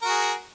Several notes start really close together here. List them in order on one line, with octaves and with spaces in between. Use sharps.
A#4 F#4 G#4